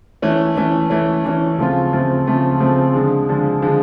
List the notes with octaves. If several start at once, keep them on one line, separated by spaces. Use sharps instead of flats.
E3 A3 C#4
E3 A3 C#4
E3 A3 C#4
E3 A3 C#4
C#3 F3 A3 C4 F4
C#3 F3 A3 C4 F4
C#3 F3 A3 C4 F4
C#3 F3 A3 C4 F4
D3 F3 G#3
D3 F3 G#3
D3 F3 G#3